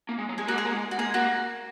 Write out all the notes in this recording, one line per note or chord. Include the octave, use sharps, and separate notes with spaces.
A#3
G#3
F#3
G#3 G#4
A#3 F#4
G#3 G#4
A#3
G#3
F#4
A#3 G#4
G#3
A#3 F#4